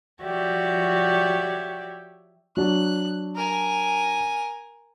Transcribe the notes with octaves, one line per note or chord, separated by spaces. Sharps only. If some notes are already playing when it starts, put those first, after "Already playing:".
F3 F#4 G4 C#5 D5 E5
F#3 D4 F#6
A#4 G#5